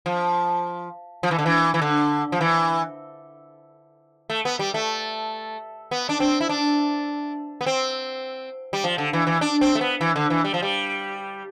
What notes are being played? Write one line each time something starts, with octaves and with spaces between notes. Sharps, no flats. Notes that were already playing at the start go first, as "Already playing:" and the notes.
F3
F3
E3
D3
E3
E3
D3
F3
E3
A3
B3
G3
A3
B3
D4
C4
E4
D4
B3
C4
G3
F3
D3
E3
E3
D4
C4
A3
B3
E3
D3
E3
G3
F3
G3